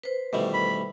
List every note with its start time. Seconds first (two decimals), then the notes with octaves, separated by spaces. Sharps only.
0.04 B4 C5
0.33 B2 D#3 E3 G3 A3
0.54 B5